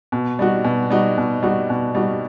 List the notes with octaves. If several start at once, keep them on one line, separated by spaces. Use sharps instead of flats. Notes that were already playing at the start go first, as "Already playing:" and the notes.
B2
G3 D#4 F#4
B2
G3 D#4 F#4
B2
G3 D#4 F#4
B2
G3 D#4 F#4